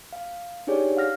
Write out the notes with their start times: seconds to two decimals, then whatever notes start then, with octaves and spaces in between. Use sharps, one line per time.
0.13 F5
0.67 D4 D#4 G4 G#4 C#5 D5
0.97 F5 F#5 F6 A#6